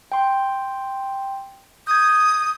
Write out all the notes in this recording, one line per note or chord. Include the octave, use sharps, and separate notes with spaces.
G5 C6
D#6 G6 G#6